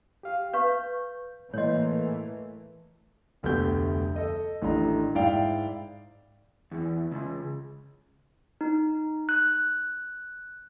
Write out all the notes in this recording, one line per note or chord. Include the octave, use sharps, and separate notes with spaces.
G4 F5
B4 F5 C#6 G6
A2 E3 A3 A#3 C#5 D#5 C6
F1 D2 A3 B3 G4 G6
A4 D#5
A1 D#3 A3 D4 D#5 A#5
G#2 E4 D5 F5 G5
E2
C#2
D#4
F#6